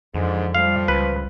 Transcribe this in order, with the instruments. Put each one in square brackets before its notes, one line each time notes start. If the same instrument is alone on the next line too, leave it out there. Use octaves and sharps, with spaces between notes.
[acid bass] F2 [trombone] G#2 [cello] D3 F3
[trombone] F3 [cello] G3 [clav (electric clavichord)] F5
[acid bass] C#2 [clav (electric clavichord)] B4